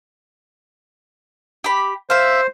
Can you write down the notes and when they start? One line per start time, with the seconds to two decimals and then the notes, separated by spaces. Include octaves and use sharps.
1.64 G4 B5
2.10 C5 E5 F5